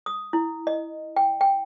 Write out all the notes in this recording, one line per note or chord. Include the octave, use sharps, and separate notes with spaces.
D#6
E4
D#5
G5
G5